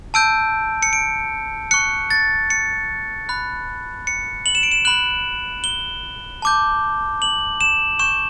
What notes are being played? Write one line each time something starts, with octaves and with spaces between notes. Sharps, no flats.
A5 E6 G6 D7
C#7
D7
C#6 F#6 C#7
A6
C#7
B5 F#6
C#7
F#7
E7
D7
E7
B5 F#6 F#7
G7
A5 D6 G6
F#7
E7
C#6 G6 E7